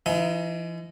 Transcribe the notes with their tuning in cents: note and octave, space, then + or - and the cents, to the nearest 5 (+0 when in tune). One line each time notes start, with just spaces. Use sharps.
E3 +45 D#4 +20